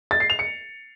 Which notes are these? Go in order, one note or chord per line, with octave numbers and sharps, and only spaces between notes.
A6
C7
F7
C#7